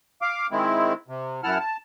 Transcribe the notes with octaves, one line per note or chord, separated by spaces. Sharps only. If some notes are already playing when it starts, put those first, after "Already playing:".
F5 D6
D#3 G#3 C4 E4
C3
F#2 E4 F#5 A5 F6
A5